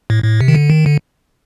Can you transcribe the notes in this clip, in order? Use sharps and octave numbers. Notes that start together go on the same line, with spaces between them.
A2
A2
C3
D#3
D3
D#3
D3